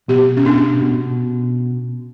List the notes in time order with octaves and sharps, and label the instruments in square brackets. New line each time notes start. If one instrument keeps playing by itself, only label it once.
[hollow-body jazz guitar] B2 [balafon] G4
[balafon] C#4
[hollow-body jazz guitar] B2 [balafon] D4
[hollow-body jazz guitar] B2